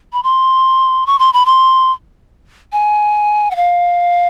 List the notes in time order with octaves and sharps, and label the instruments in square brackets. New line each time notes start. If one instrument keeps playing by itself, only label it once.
[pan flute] B5
C6
C#6
C6
B5
C6
G#5
F#5
F5